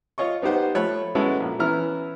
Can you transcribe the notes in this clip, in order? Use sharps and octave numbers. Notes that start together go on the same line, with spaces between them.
F4 C#5 D#5 C#6
B3 D#4 G4 C5 F#5
F3 A3 C#5 B5 F#6
G#3 B3 C#4 E4 F#4 A4
A#1
E3 B3 C#4 E4 A#5 F6